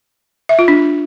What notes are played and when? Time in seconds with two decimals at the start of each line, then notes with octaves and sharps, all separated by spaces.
0.49 E5
0.59 F4
0.68 D4